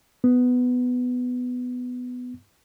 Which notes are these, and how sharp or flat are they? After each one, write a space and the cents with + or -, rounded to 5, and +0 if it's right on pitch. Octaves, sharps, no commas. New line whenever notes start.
B3 +10